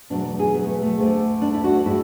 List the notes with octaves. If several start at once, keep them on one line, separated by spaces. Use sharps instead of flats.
E2 B2 F#3 A3 D4
G#4
B3
A3
A3
D2 D3 A3
D4
E4
F#4
D4
A2 G#3 E4